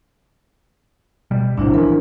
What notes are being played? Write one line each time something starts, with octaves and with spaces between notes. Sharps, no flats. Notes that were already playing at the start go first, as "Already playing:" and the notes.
B2 G3
A#1 A2 C3 D4 E4 C5
E3 F3 C#4 A#4